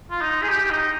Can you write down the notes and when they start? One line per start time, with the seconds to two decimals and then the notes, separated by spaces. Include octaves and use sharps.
0.11 F4
0.21 D#4
0.43 G#4
0.48 G4
0.70 D#4